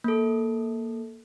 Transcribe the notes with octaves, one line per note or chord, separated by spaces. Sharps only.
A#3 A4